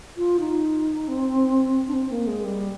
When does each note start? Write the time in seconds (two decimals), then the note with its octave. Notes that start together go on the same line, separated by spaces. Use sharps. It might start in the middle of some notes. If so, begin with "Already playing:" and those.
0.17 F4
0.40 D#4
1.08 C4
1.87 D4
1.93 C4
2.10 A#3
2.27 G#3
2.44 G3